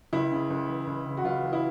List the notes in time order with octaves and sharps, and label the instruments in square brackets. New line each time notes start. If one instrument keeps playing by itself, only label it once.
[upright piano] C#2 E4
C#3
C#2
E3
C#2
C#3
F#4
C#2 F4
E3
E4